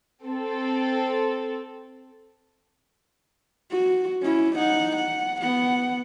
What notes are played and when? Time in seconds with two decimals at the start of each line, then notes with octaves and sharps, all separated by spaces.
0.25 C4 A4
3.71 F#4
4.23 C#4 E4
4.56 D#4 F#5
4.96 F#5
5.41 B3 F#5